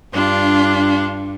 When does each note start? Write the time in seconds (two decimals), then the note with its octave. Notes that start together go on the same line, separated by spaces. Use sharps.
0.13 G2 D4 F4